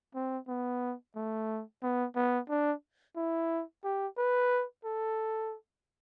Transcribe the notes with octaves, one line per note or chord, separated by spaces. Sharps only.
C4
B3
A3
B3
B3
D4
E4
G4
B4
A4